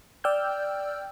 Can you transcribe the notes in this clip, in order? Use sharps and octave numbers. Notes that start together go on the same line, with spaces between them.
D5 G5 E6 F6 G6